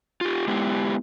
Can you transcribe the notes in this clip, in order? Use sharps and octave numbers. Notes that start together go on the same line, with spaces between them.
F4 G4
G#3 B3 E4 G4